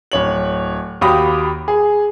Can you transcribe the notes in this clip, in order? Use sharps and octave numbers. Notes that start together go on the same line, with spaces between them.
D1 C#5 F#7
D#2 F#4 G4 B5 D6 D#6
G#4